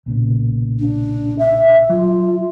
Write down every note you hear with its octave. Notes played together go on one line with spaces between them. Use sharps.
B1 A#2 C#3
D4
E5
F#3 F4